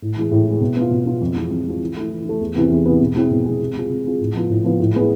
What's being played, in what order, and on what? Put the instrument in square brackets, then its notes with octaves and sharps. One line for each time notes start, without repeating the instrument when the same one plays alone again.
[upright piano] A2
E3 G#3
A2
E3
G#3
B2
B3 F4
B2
B3 F4
F2
E3 G#3 C4 F4
F2
E3 G#3 C4 F4
E3
A3 E4
E3
A3 E4
E2
C3 E3 B3
E2
C3 E3 B3
B2
G#3 C4 E4 G#4
B2
G#3 C4 E4 G#4
C3
G#3 C4 F4 G#4
C3
G#3 C4 F4 G#4
A2
F3 B3 F4
A2
F3 B3 F4
A2
G#3 B3 E4 G#4